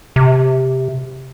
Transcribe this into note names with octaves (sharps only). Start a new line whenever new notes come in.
C3